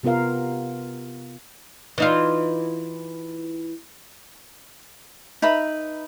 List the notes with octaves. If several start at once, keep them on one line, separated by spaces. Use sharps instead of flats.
C3 B3 F4 A#4 F5
E3 D#4 F4
D#4 B4 E5 B5